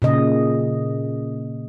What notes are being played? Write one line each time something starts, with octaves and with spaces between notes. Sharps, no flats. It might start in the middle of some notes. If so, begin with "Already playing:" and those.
A#2 C#3 D#5